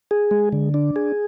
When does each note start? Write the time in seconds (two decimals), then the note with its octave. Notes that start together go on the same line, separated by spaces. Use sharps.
0.11 G#4
0.31 G#3
0.52 D3
0.74 D4
0.96 G#4